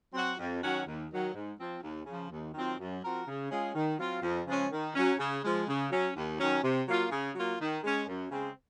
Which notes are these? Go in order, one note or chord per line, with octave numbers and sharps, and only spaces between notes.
F#3 C4 F#4
F2
D#3 F#3 C#4 F#4
D#2
D#3 F#3
G#2
F3 C4
D#2
C#3 F3
D#2
D#3 F#3 C4 F4
F#2
F3 C4 F#4 A#4
C#3
G#3 C#4 F4 G#4
D#3
F#3 C4 F4
F2
C#3 F3 G#3 C#4
D#3
F#3 C#4
C#3
F3 G#3
C#3
F#3 C#4
D#2
D#3 F#3 C#4
C3
F#3 A#3 F4
C#3
F#3 A#3 F4
D#3
G#3 C#4
F#2
C#3 G#3 C4